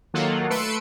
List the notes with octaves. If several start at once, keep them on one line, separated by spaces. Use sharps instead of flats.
D#3 F#3 A#3 F4 A4 F#5
A3 B4 C6 E6 C#7 D7